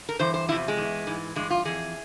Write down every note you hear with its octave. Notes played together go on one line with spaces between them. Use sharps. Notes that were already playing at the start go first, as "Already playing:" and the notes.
A#4
G2 E3 C5
C5
E2 C3 F3 E4
G#3
E2 E3
G#2 E3
G2 E3 G#3
F4
F2 E3 G#4